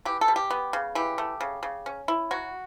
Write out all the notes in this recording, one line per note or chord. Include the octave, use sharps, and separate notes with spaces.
E3 G4
A4
G3
G4
B3
C#3
E3 G4
A3
C#3
C#3
C#4
E4
F#3 F#4